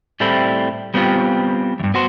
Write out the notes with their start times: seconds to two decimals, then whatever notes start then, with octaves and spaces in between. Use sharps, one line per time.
0.20 A2 G3 A3 C4 E4
0.94 G3 B3 C4 D#4 F4 G4
1.80 E2 G2
1.94 B3 F#4 C5